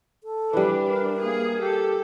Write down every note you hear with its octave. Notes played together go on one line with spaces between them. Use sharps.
A4
E3 G3 D4 B4
A#4
A#3 G#4
G4 A4